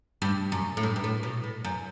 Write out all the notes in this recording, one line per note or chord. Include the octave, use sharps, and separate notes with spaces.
G2
F#2
A2
G2
G2
A2
B2
A2
F#2